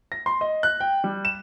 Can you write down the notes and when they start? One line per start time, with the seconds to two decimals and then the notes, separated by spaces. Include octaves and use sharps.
0.12 A#6
0.26 C6
0.41 D#5
0.63 F#6
0.80 G5
1.04 G3
1.25 E7